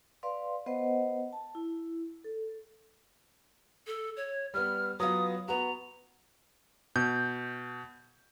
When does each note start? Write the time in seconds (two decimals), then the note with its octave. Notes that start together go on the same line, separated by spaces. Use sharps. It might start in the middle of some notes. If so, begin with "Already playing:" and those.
0.23 B4 D5 F5 C6
0.66 B3 B4 C5 D#5 F#5
1.33 A5
1.55 E4
2.24 A4
3.87 A4
4.17 C#5
4.54 G3 B3 F6
5.00 F#3 B3 F4 D#6
5.48 B3 F#4 A#5
6.96 B2 G6